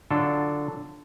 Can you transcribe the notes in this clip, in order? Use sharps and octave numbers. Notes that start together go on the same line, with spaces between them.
D3 F#3 D4 F4 A4